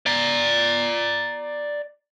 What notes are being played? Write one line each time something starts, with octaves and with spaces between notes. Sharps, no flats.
D5 A#5